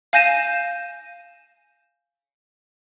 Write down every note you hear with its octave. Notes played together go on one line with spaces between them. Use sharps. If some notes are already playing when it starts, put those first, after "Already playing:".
F5 G#5 G6 A#6 D#7 E7